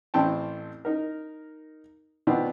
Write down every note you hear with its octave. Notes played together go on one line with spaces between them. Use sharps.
A1 C4 G5 A5
D#4 A#4
B2 D#3 B3 C4 D4 F4